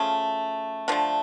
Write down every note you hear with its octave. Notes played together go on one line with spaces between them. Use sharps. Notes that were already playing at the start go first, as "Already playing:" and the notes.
Already playing: C#3 F3 A3
D3 F3 A3